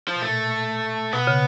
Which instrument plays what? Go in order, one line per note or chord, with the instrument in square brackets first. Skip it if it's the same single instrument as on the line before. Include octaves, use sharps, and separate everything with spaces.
[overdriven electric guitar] F3
[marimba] B2
[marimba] A#2 [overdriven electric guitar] A3
[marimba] B2 [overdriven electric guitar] B3
[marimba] C#3